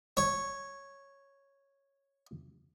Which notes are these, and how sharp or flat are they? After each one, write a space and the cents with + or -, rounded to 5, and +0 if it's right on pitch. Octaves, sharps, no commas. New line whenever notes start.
C#5 -5